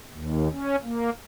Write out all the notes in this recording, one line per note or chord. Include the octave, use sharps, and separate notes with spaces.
D#2
C#4
A#3